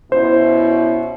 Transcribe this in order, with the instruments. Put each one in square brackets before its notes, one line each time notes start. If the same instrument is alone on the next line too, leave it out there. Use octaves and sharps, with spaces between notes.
[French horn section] B2 C#4 E4 [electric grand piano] C5